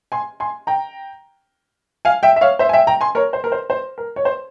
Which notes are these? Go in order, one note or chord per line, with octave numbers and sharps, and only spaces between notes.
G#5 C6
G#5 C6
G5 A#5
F5 G#5
E5 G5
E5
C#5 F5
C5 E5
G#5
E5 G5
G5 A#5
G#5 C6
A#4 C#5
C5
A#4
C5
C5
A#4
C#5
C5